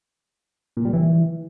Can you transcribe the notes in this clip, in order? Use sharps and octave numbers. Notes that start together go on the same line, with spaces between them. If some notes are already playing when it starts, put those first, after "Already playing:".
A#2
G3
E3